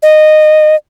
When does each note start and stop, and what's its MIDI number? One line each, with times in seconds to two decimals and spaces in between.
0.03 0.75 75